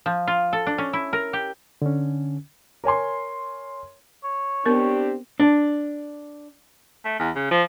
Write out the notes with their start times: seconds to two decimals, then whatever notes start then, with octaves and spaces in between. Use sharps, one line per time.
0.06 F3
0.27 F4
0.53 A4
0.67 D4
0.78 C#4
0.93 E4
1.13 A#4
1.33 G4
1.82 D3 C#4
2.84 A#4 C#5 G#5 C6
4.24 C#5
4.65 B3 C4 D4 G4 A#4
5.40 D4
7.05 A3
7.19 E2
7.35 C#3
7.51 F3